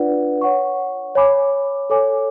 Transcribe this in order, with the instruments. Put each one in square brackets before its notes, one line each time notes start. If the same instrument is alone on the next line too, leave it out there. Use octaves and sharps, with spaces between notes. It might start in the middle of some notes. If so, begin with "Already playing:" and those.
Already playing: [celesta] D4 F4 B4 D5 F#5
C#5 F#5 C#6
C#5 G#5 B5 D6
A4 C#5 G#5 D6